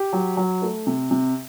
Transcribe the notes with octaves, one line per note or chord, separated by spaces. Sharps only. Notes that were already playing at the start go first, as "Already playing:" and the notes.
Already playing: G4
F#3
F#3
A3
C3
C3